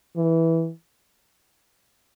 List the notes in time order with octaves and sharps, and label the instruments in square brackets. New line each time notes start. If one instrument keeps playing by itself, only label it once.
[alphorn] E3